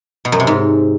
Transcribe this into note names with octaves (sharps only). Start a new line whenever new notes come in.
B2
F#2
C3
G#2